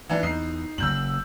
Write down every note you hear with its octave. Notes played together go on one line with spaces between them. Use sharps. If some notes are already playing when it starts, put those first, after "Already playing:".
E3 D4
E2 D#4 C7
F#1 F#2 E6 G6 F#7